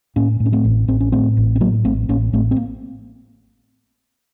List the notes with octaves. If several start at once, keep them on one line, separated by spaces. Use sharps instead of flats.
A2 A#3 C#4
A2
C#4
A3 C4
A1
A1 C4
C#4
A2 A3 C4
A1
C4
A2 F#3 A#3
A1 A3 C4
A1 A#3 C#4
A1 A3 C4
C4
A#3